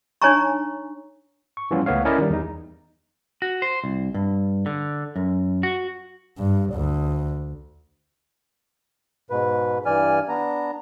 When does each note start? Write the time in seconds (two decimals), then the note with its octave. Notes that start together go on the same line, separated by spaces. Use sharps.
0.22 D4 D#4 C#5 G#5 A#5 C#6
1.57 C#6
1.71 E3 F3 G3 B3 C#4 F4
1.86 C#2 A3 B3 C#5 F5
2.05 C#4 E4 A#4 D5 D#5
2.18 D#3 G3
2.30 E2 D#4
3.42 F#4
3.62 C5
3.84 C2
4.14 G2
4.66 D3
5.16 F#2
5.63 F#4
6.38 G2
6.73 D2
9.30 G#2 B2 B4
9.86 G2 E3 D5 G#5 F6
10.29 B3 D4 A#5